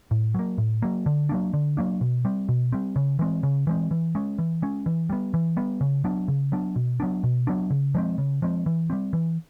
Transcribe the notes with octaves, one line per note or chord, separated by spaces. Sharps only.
A2
F#3 A#3
A2
F#3 A#3
D3
F#3 A#3 D4
D3
F#3 A#3 D4
B2
G3 C4
B2
G3 C4
C#3
E3 G#3 C4
C#3
E3 G#3 C4
E3
G#3 C#4
E3
G#3 C#4
E3
G3 B3
E3
G3 B3
C#3
F#3 B3 D4
C#3
F#3 B3 D4
B2
F#3 B3 D4
B2
F#3 B3 D4
C#3
F3 G#3 C4
C#3
F3 G#3 C4
E3
G3 C4
E3